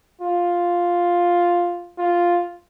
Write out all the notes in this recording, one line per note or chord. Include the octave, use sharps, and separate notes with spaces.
F4
F4